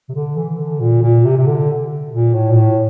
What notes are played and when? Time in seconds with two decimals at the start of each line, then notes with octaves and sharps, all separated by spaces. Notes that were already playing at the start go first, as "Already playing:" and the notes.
0.09 C3
0.14 D3
0.36 E3
0.58 D3
0.80 A#2
1.02 A#2
1.25 C3
1.37 C3
1.47 D3
2.12 A#2
2.34 A2
2.51 A#2
2.56 A2